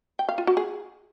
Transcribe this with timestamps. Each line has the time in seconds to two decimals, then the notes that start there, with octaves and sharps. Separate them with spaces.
0.19 G5
0.29 F5
0.38 F4
0.47 F#4
0.57 G#4